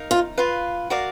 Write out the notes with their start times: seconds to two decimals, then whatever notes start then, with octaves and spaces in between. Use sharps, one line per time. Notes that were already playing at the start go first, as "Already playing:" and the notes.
Already playing: D#4 A#4 F5
0.11 F4
0.38 F4 B4 F5
0.90 F#4 A#4 D5 F5